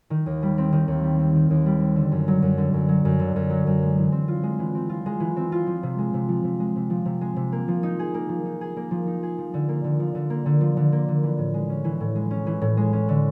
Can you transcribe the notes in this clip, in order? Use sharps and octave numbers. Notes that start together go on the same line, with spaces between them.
D#3
D#2
G3
C4
D#3
D#2
G3
C4
D#3
D#2
G3
C4
D3
F#2
F#3
F#2
D3
F#2
F#3
F#2
D3
F#2
F#3
F#2
G#3
E3
C4
F4
G#3
E3
C4
F4
G#3
E3
C4
F4
F3
C3
G#3
C3
F3
C3
G#3
C3
F3
C3
G#3
C3
A#3
F3
D#4
G#4
A#3
F3
D#4
G#4
A#3
F3
D#4
G#4
F3
D3
A#3
D3
F3
D3
A#3
D3
F3
D3
A#3
D3
E3
A2
G#3
C#4
E3
A2
G#3
C#4
E3
A2
G#3
C#4
D3